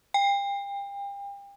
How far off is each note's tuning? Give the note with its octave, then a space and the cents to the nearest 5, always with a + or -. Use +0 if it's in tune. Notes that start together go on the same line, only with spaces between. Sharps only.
G5 +35